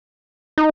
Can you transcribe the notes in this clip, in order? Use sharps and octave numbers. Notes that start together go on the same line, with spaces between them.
D#4